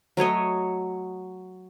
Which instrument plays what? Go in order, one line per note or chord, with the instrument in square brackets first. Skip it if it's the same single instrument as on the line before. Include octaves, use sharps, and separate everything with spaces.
[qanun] F#3 A3 C#5 D#5